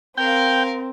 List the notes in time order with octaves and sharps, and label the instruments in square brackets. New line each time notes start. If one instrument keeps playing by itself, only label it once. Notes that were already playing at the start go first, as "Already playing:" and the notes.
[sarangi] C4 [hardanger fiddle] A#4 F5 [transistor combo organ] G5